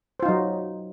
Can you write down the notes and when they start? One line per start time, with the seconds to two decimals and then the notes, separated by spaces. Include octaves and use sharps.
0.20 C5
0.23 F4
0.25 D#4
0.28 F#3